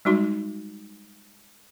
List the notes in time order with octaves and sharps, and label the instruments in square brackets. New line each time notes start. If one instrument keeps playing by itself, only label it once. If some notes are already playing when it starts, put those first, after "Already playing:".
[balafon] G3 G#3 D#4 F#4 C6